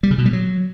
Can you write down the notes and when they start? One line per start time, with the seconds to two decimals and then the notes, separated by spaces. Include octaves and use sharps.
0.03 G3
0.11 C#3
0.18 B2
0.26 G3
0.33 F#3